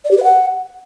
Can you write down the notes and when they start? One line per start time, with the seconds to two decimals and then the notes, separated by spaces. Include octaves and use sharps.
0.04 D5
0.11 G4
0.17 B4
0.23 F#5